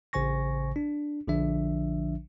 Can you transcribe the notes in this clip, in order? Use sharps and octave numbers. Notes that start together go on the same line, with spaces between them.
A1 C#3 C5 G#5 C#6 A#6
D4
A#1 D3 F3 D4 E5